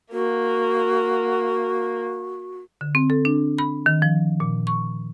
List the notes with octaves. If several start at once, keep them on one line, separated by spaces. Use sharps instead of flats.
A#3 F#4
D3
C4
A4
D4
B5
D#3
F3
A#2
C#6